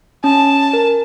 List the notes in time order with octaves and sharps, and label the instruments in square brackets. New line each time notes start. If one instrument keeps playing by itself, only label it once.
[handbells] C#4 [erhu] A5
[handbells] A#4